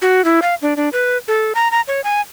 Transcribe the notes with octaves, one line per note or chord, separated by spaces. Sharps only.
F#4
E4
F5
D4
D4
B4
A4
A#5
A#5
C#5
G#5